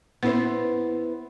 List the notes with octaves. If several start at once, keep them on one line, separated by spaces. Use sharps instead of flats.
B3 E4 B4 C5